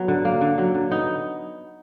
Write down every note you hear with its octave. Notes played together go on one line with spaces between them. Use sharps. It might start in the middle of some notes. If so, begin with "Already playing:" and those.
Already playing: F#3 B3
D3
A#3
D3
F#3
D3
B3 D#4